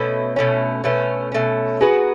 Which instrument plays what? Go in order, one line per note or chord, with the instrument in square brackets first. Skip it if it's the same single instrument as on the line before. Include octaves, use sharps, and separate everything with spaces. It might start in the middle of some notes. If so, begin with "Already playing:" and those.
Already playing: [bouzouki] B2 A3 C#4 [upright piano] B4
[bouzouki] B2 A3 C#4 [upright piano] C#5
[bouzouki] B2 A3 C#4 [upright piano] B4
[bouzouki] B2 A3 C#4
[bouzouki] F#3 B3 F#4 B4 [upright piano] G#4